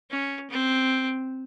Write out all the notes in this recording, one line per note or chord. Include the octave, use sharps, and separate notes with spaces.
C#4
C4